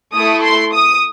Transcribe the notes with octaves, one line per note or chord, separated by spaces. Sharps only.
A3 E4 A4 D#6
C6
D#6